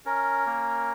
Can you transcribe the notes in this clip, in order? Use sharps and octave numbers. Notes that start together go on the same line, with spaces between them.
C#4 A#4
A#3